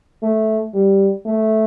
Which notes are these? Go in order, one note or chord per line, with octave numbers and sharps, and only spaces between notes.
A3
G3
A3